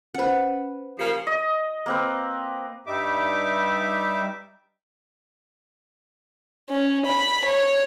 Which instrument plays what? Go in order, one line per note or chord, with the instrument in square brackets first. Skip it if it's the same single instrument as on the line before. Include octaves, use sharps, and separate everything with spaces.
[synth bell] C#4 C5 [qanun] B4 F#5
[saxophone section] C#3 F3 A#3 [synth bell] G4 C7 C#7
[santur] D#5
A#3 C4 B4
[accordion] G2 G3 D#4 E5 D6
[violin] C#4
B5
C#5